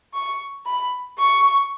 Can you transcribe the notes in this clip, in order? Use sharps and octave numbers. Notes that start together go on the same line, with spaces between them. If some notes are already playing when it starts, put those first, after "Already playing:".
C#6
B5
C#6